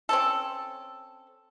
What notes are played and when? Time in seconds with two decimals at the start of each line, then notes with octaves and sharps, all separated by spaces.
0.09 C4 C#4 A4